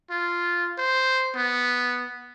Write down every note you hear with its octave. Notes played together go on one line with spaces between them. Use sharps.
F4
C5
B3